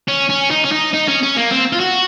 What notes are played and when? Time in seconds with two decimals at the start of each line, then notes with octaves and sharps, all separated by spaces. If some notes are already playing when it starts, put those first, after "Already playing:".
0.08 C#4
0.30 C#4
0.51 D#4
0.65 C#4
0.72 D#4
0.94 D#4
1.08 C#4
1.23 C#4
1.37 A#3
1.51 C4
1.73 F4
1.80 F#4